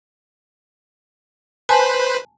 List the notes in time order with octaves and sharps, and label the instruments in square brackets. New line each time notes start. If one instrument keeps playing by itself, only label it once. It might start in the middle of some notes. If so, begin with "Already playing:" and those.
[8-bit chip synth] B4 C5 B5 [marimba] G#5 A5